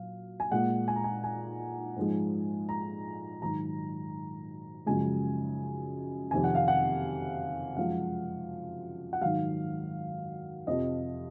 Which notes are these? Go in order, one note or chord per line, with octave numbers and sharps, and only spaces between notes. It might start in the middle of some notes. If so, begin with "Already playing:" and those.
Already playing: A#2 F#3 F5
G#5
A#2 G#3 F#5
G#5
A#5
G#5
G#5
G#2 F3 G#3
A#5
G#2 D#3 F#3 A#5
F#2 C#3 F3 G#3 G#5
F2 C3 D#3 G#5
F#5
F5
F#5
F#2 F3 G#3 F5
F#5
G#2 D#3 F#3 F5
F2 C3 F3 D#5